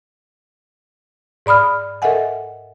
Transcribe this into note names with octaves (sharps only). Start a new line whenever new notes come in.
G#2 D5 B5 D#6 F6
A4 A#4 D#5 E5 F#5 G#5